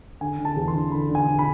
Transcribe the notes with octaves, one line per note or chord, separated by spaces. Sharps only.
D3 G#5
D3
A5
E2
C6
D3
D3 B5
D3
G#5
D3
B5